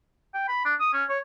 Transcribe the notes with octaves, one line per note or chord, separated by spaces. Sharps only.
G5
B5
D4
D#6
C#4
C#5